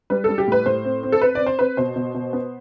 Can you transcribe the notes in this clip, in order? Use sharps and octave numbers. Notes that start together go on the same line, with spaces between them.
G3 B4
G3 A4
G4
A2 B4
A2 C5
C4
C4
A4
C4 B4
C4 D5
C5
C4 B4
B2 C5
B2
B2
B3